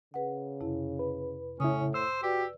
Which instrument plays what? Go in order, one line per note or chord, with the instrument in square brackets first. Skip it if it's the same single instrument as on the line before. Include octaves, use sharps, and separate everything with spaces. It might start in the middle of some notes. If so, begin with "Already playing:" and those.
[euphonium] C#3 [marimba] G#4 B4 F#5
[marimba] F2 C3 E4
[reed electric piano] B4
[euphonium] A2 [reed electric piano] C#3 E4 [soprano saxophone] C#4 [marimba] D#6
[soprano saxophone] C5 [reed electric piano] E6
[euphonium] F#4 [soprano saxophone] G4 [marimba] B4 D5